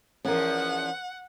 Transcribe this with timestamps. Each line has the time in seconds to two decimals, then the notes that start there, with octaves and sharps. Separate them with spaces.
0.25 E2 F3 C#4 A#4 F#5